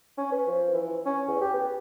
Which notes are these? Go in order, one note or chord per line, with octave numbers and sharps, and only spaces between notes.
C#4
B4
F3
E3
C#4
E2
G4
B3